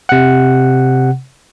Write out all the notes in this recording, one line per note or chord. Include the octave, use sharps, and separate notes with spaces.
C3 F#5